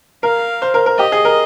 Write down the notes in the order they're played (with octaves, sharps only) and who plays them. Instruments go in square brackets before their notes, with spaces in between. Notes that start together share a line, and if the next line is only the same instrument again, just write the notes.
[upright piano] A#4 [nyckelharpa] F5
[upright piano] C5
A#4
A#4
[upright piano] G4 [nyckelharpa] D#5
[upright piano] G#4
A#4